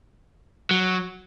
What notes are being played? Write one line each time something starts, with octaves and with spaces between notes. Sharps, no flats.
F#3